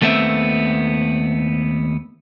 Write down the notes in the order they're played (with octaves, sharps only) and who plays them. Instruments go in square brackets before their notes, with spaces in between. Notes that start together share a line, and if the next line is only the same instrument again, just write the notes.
[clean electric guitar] D#2 A3 B3 C4 E5